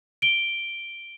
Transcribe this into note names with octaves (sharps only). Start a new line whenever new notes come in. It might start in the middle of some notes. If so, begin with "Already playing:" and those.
D7 G7